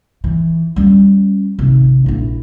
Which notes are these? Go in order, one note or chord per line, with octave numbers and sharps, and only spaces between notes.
E3
G3 C#4
G#1 C3
A#1 E4